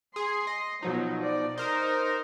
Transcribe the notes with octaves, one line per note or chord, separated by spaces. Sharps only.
G#4 C6
D#5
B2 F3 F#3 D#4
D5
D#4 A#4 C5